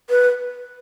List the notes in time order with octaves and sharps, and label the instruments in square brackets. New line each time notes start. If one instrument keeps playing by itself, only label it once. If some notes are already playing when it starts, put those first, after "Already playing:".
[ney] B4